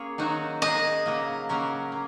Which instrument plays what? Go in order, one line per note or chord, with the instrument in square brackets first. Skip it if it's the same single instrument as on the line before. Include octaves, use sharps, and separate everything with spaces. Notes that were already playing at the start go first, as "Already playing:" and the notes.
Already playing: [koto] A#3 C#4 G#4 C#5
D#3 F#3 D#4 F#4
[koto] G#3 D#4 G#4 [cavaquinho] D#5
[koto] C#3 F#3 A#3
C#3 F#3 A#3 C#4 A#4
A#3